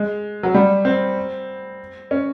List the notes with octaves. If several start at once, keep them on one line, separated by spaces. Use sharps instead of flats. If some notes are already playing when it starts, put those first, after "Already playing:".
Already playing: G#3
F#3
G3
C4
C#4